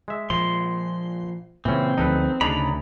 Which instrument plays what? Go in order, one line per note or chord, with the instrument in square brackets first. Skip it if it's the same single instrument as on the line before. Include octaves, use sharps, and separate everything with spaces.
[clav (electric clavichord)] G#3 E5
[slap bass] A#2 F3 [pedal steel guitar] C6
[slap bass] A#2 C#3 [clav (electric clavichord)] E3 C#4 [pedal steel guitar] C4
[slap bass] D2 F3 F#3 [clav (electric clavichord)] D#4 A4 B4
[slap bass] D2 [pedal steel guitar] C#3 A#5 B5 [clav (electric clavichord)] D4 D#4 G#4